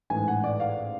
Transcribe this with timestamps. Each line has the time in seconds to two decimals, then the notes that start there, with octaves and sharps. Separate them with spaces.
0.10 A1 G#2 G#5
0.28 F#5
0.44 D5
0.60 F5